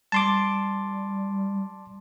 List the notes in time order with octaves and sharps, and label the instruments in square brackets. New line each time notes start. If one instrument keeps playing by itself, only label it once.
[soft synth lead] G3 [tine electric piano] A5 C6 D6